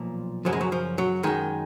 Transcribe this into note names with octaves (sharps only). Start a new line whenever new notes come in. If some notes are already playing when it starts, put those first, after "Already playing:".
Already playing: B1 A#2 F3
F#2 C#3 F3 F#3
G#3
F#3
F3
F#3
F#2 D#3 G#3